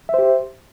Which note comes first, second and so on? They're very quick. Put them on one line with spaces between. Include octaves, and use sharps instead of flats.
E5 C5 G4